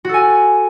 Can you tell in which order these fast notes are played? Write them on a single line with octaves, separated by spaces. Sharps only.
F#4 A4 G#5